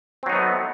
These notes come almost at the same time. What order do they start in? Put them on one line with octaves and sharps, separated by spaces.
C4 F#3 D#4 B3 A3